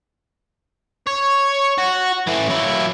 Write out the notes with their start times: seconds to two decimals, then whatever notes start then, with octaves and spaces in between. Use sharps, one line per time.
1.07 C#5
1.78 F#4
2.27 E3 A3
2.49 F#3 E4